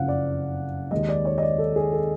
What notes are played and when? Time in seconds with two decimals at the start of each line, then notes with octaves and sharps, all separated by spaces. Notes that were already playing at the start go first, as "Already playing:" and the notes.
Already playing: F#1 F2 C#3 F5 F#5
0.08 D5
0.91 D#2 D#3 G#3 D#5
1.09 D5
1.25 C#5
1.38 D#5
1.43 D5
1.58 A4
1.76 G#4
1.92 A4